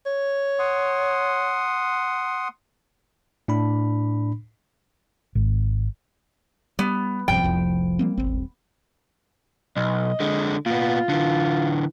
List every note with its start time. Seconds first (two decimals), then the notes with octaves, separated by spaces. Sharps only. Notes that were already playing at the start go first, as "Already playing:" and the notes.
0.06 C#5
0.59 F#5 C6 D#6
3.48 A2 D4 B5
5.35 G#1
6.79 G3 B3
7.28 D1 G2 C3 F3 G5
7.43 F1 C2 F2
7.99 G3 A#3 C4
8.18 D#1 G#1 C4
9.77 B1 D#5
10.20 D3 G#3
10.66 A#2 B3 F4
11.09 D3 E3